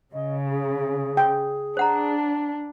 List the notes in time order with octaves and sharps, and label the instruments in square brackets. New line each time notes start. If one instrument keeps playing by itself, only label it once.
[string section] C#3 [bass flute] D#5
[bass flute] G#4
[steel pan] G5
[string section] D4 [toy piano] C5 F#5 A#5